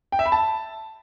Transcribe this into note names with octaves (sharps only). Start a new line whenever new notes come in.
G5
E5
B5
A5